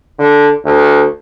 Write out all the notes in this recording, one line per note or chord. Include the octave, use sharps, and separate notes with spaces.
D3
D2